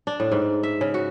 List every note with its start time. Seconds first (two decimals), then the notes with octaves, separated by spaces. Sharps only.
0.07 D4
0.20 A2
0.32 G#2
0.63 E5
0.81 C#3
0.94 F#4